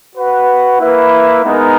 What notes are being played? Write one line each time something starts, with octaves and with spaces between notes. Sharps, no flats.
F#4 B4 F#5
A#3 E4 B4 E5
G#3 B3 D#4 A#4